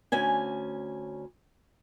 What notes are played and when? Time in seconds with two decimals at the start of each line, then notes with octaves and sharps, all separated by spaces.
0.12 D2 C#4 G#5